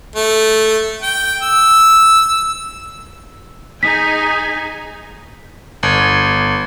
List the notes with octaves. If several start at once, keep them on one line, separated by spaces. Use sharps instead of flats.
A3
G5
E6
D#4 G#4 G#5 B6
G1